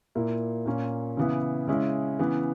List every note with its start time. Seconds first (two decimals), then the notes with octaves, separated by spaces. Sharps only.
0.15 A#2 A#3 E4
0.66 A#2 A#3 C#4
1.17 C#3 E3 B3 E4
1.67 C#3 G#3 C#4 E4
2.19 C#3 E3 B3